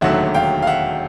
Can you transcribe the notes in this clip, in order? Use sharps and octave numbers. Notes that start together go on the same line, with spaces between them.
E1 D#2 D3 F#3 A3 E5 F#5
F5 G5
F5
E5 F#5